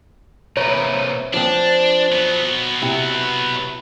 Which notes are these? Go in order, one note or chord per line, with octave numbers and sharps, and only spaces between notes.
C3 A#4 B4 C#5
F3 C4 D4
F#3 B3
C3 E4